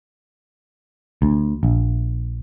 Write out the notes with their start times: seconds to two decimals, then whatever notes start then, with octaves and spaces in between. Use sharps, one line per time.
1.22 D2
1.63 A#1